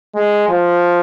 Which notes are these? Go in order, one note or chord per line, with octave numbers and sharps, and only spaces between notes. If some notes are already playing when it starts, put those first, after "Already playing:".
G#3
F3